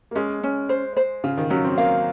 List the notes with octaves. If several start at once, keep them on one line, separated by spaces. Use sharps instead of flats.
A#3
G#3 C#4
C#4
C5
C5
C#3 F4
D#3
F#3 C#4
C4
A#3 F5